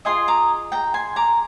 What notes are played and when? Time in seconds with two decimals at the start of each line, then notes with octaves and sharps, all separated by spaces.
0.05 F4 G#4 D#5 G#5 C6
0.28 A#5 D6
0.72 G5 A#5
0.94 G#5 C6
1.16 A#5 D6